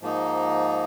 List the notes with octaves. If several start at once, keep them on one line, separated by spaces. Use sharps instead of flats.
G#2 F3 A#3 D#4